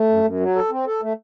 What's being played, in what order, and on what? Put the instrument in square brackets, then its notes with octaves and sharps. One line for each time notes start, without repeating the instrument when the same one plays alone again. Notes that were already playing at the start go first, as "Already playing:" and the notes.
Already playing: [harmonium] A3
F#2
F#2
F#3
A4
C4
A4
A3